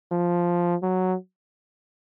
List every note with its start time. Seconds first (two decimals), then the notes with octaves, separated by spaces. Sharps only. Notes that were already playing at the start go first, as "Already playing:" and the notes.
0.12 F3
0.83 F#3